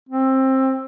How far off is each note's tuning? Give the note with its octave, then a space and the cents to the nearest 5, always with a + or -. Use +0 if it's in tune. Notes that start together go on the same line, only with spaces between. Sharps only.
C4 +20